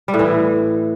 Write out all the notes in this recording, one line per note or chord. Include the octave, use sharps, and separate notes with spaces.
G3
A2
E3